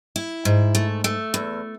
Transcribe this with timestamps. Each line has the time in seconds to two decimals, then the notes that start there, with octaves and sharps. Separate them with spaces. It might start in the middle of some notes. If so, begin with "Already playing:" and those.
0.16 E4
0.45 G#2
0.75 A3
1.04 A3
1.34 E2